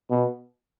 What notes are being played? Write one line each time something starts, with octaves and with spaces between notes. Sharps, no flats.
B2